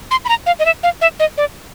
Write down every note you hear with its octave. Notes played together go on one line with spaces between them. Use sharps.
C6
B5
A#5
F5
D#5
E5
F5
E5
D#5
D5